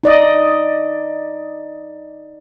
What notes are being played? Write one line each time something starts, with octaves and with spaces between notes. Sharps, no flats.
D#4 D5 D#5